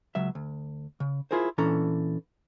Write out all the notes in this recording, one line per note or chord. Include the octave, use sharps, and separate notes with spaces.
C#2 F#3 E5
D2
C#3
E4 F4 G#4 A#4 C5
A#2 E3 C#4 D4 A4 A#5